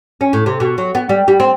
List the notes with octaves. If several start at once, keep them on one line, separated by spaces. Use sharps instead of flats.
C#4
A2
C3
B2
F#3
B3
G3
G3
C4